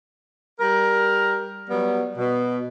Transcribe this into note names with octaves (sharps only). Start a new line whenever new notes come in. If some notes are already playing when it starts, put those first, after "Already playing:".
G3 A#4
F#3 G3 B3
B2